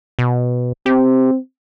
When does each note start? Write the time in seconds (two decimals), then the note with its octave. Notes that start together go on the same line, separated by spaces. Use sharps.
0.19 B2
0.86 C4 G4